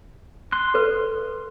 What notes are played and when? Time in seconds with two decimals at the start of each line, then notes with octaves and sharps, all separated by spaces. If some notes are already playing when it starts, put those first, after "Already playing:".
0.52 C6 F#6
0.74 A4 B4